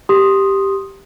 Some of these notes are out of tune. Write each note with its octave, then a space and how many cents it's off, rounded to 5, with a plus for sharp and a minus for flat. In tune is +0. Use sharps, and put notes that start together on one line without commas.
G4 +0 C6 +15 D#6 +0